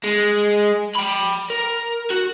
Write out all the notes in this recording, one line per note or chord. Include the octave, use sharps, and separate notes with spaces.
G#3
G5 B5
A#4
F#4